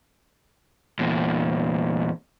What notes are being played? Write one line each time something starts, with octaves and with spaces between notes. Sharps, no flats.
E2 A#2